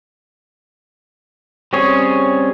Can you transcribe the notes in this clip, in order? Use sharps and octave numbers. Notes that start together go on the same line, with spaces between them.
G3 C4 C#4 G#4 C#5